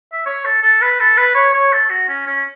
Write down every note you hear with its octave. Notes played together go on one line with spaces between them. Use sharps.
E5
C#5
A4
A4
B4
A4
B4
C#5
C#5
A4
F#4
C#4
C#4